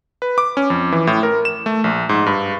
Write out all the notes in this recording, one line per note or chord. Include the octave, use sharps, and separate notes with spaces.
B4
D6
C#4
F2
E3
A2
A#4
E7
A3
A#1
G#2
G2